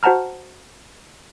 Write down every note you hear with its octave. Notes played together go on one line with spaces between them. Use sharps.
F#4 C5 F#5 A5 A#5 F6